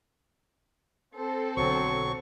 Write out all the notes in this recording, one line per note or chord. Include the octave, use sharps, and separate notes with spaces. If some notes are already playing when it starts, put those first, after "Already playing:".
C4 A4 C5
B1 B2 D3 F#3 C#6